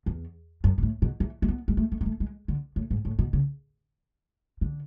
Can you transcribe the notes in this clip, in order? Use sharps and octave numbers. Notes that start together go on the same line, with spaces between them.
E2
F#2
B2
A2
B2
E3
A3
B3
G#3
A3
A3
G#3
A3
G#3
D3
A2
G#2
A2
B2
C#3
D3